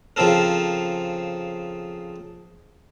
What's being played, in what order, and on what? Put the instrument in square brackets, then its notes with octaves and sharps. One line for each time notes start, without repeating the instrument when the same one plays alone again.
[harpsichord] C#3 F3 C4 A4 A#4